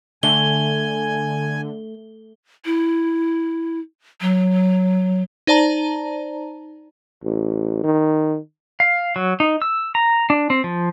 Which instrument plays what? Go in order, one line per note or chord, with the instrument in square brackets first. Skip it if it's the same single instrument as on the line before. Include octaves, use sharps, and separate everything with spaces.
[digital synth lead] D3 [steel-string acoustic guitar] A3 [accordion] G#5 [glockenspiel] G7
[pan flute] E4
F#3
[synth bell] D#4 C5 D5 A5 A#5
[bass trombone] A1
D#3
[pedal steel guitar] F5
F#3
D#4
E6
A#5
D4
C4
F3